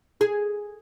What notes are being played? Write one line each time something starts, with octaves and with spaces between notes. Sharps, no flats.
G#4